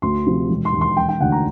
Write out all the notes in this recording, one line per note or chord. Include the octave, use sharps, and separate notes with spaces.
D2 C6
C3 F3
E1
C6
D#2 D#3
C6
E1 G5
G5
D2 D3 F#5
A#5